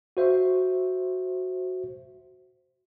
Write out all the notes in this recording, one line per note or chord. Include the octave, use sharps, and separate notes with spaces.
F#4 C5 E5